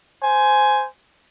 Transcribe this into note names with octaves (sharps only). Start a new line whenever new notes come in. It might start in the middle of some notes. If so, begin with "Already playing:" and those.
C5 G#5